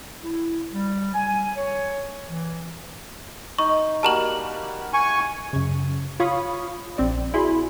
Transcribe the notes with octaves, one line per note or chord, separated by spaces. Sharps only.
E4
G3
G#5
C#5
E3
D#4 C#6
G3 A#3 F#4 A5 A#5 F#7
G#5 C#6
F#2 C#3
F4 C#5 F5 B5 C#6 D#6
A#1 C4 D5
E4 F#4 G#4 G#5 B5 C6